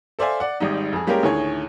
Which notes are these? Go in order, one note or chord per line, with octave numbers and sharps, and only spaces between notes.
A4 C5 D5 E5 F5 G#5
D5 F#5
G#1 G#2 G3 D#4
F2 G#4
G3 G#3 A#3 C#4 G4 A#4
D2 A2 D#3 G#4 C#5